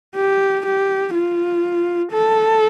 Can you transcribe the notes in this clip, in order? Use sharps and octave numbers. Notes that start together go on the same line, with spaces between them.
G4
G4
F4
A4